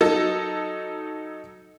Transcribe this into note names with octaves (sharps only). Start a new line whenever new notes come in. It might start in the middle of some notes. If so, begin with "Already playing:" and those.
F#3 D#4 A4